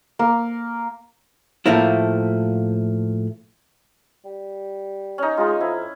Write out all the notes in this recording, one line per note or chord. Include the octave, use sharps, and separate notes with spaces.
A#3
A2 F3 A3 A#3 E4
G3
C#4 D#4
G#3 D#4 F4
F2 E4